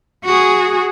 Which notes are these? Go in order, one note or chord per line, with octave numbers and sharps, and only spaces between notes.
F#4 G#4